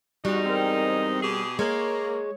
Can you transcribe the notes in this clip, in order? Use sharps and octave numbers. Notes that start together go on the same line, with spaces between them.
E2 G3 G#3 D#4 F#4
C4 A#4
B2 G4 G#4
G#3 A#3 C#5